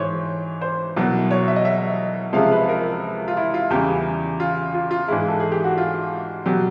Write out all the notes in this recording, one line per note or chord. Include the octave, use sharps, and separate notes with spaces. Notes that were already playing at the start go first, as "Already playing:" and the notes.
Already playing: G#2 E3 C5 C#5
C5
C2 B2 F#3
C#5
E5
D#5
E5
C#2 C3 F3 G#3 F5
B4
A#4
F4
E4
F4
E2 C#3 E3 G3 G4
F4
F4
F4
G#2 E3 G#3 E4
A4
G#4
G4
F#4
F4
B2 F#3 G4